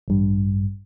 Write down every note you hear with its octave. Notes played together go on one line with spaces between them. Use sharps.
A1 G2